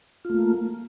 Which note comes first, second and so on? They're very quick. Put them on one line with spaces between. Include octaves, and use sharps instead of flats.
F4 A3 A#3